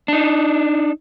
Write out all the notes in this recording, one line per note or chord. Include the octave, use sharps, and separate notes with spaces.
D4 D#4